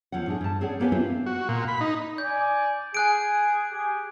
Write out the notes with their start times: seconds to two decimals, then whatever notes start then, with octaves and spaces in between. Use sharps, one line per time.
0.12 E2 F3 C#4 F#5
0.26 A2 D4 G#4
0.41 G2 A5
0.61 C4 G#4 C#5 D5 F#5
0.80 A#3 B3 G4 B4 C#5 G#5
0.92 C4 D4 E4 F4 B4 C5
1.26 F#4
1.49 A#2
1.68 B5
1.81 D#4
2.18 D5 G#5 G6
2.94 G#4 G#5 F#6 D7
3.72 G4 G#4